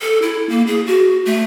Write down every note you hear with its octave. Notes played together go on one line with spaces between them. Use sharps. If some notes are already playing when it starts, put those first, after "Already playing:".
A4
E4
A#3
G#4
F#4
A3